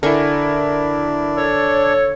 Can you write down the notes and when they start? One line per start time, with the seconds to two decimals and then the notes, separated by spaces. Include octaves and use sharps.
0.03 D3 D4 E4 A#4 G#5 C#6
1.37 A4 C#5